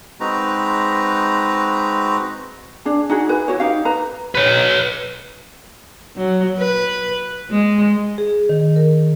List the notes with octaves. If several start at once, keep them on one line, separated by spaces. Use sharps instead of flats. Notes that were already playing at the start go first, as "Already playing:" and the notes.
G#3 C4 D#4 F#4 B4 A#5
D4 G#4
D#4 F#4 G#4
B4 G#5
E4 F#4 C#5
D#4 G4 F5
B4 A#5
B4 C#5
F#3
B4
G#3
G#4
D#3
A#4